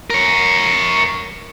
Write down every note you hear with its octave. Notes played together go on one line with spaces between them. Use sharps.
A#4 C#5